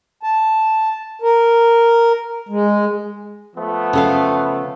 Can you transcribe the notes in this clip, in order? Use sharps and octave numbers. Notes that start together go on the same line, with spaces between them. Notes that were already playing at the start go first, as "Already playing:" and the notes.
A5
A#4
G#3
F3 A3 B3
C#3 A4 F5